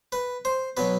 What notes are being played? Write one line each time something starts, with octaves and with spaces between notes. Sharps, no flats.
B4
C5
B2 F#3 B4